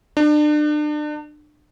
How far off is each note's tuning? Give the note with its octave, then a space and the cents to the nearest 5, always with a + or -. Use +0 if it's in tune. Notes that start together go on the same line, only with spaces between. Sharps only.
D4 +35